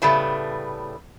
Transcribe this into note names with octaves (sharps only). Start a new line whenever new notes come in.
A2 C#3 G3 A3 B3